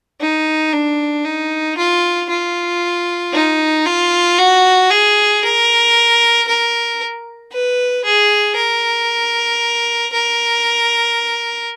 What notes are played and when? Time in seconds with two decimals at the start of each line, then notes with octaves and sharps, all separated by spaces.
0.20 D#4
0.73 D4
1.25 D#4
1.77 F4
2.29 F4
3.33 D#4
3.86 F4
4.38 F#4
4.90 G#4
5.43 A#4
6.47 A#4
7.52 B4
8.04 G#4
8.56 A#4
10.13 A#4